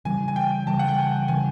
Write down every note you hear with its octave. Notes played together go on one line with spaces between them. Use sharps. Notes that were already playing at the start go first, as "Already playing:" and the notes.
C#3 E3 G3 G#5
G#5
G5
C#3 E3 G3 A5
F#5
G5
G#5
C#3 E3 G3 G#5